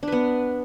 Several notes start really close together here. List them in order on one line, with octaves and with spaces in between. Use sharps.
D4 B4 B3